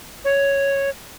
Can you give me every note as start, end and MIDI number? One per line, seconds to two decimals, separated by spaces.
0.24 0.90 73